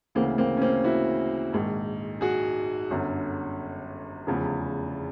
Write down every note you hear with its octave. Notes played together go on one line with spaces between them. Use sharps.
D2 C#3 E3 A#3 C4
A#3 C4
C#4
A#3 C4
E4 F#4
A#1 G#2 D#3
F#4 G#4
G1 F#2 D3
F1 E2 C#3 F3